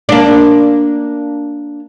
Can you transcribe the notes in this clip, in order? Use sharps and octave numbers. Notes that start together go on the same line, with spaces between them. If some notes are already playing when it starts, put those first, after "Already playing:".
A#3 D4